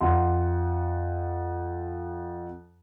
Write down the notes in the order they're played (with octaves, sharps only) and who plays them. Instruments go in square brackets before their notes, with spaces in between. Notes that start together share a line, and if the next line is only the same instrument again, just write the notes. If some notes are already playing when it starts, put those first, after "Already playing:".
[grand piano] F2 F#5 C6